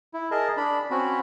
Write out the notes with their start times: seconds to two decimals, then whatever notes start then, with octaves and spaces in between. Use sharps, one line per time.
0.14 E4
0.31 G#4 A#4 D#5 A5
0.57 D4 B5
0.91 C4 C#4 F#4 B5